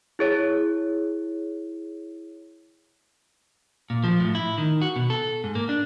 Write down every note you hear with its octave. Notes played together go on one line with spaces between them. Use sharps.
E4 G#4 C#5
A#2
F3
A2
E4
D#3
F#4
B2
A4
G#2
A#3
D4